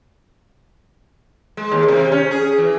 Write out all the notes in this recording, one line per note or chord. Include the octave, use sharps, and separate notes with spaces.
G#3
D#2
C3
C#4
G#4
E3